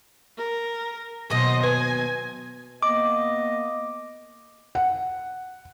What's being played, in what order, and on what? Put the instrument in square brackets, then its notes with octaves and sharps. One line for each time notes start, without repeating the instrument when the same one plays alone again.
[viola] A#4
[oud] D#2 B2 F#3 [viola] C5 D#5
[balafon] B4 [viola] G#5
[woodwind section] A#3 B3 D#5 [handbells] D6
[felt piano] F#5